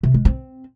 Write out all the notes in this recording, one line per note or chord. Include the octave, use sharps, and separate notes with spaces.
C3
G#3
C4